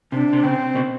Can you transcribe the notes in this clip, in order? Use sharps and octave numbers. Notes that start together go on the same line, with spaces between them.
C3 D4
C3
C#3 C4
B2